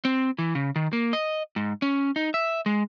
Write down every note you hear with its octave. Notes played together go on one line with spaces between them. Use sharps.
C4
E3
C#3
D#3
A#3
D#5
G#2
C#4
D#4
E5
G#3